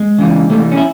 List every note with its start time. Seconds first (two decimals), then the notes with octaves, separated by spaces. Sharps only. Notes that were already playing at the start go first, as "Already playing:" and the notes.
Already playing: G#3
0.18 C#3 E3 G3
0.50 C3 E3 G3 A3
0.71 C#4
0.77 E4